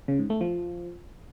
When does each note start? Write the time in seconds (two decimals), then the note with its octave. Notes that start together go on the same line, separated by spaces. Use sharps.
0.08 C#3
0.19 G#2
0.30 A3
0.41 F3